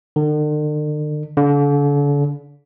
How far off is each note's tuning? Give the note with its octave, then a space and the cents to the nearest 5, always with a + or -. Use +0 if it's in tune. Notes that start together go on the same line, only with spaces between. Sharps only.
D3 +45
D3 -40